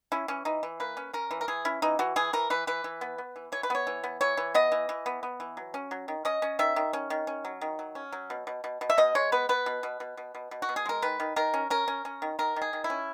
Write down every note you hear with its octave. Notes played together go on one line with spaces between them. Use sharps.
C#4 E4
E3 C#4
E3 D#4
E3
A#3 B4
C#4
C#4 A#4
E3
A#4
E3 G#4
C#4 E4
E3 D#4
E3 F#4
E3 G#4
E3 A#4
E3 B4
E3 B4
E3
B3
B3
E3
E3 C#5
B4
B3 C#5
E3
B3
E3 C#5
E3
B3 D#5
E3
E3
B3
B3
E3
F#3
C#4
F#3
D#3
C#4 D#5
C#4
D#3 E5
D#3
C#4
D#3
C#4
F#3
D#3
F#3
C#4
F#3
B2
B2
B2
B2
E5
B2 D#5
G#3 C#5
B3 B4
B3 B4
B2
B2
B2
B2
B2
B2
F#4
B2
G#4
G#3 A#4
D#3 B4
D#3
D#3 A#4
C#4
C#4 A#4
C#4
C#4
D#3
D#3 A#4
D#3
G#4
D#3
E4
C#4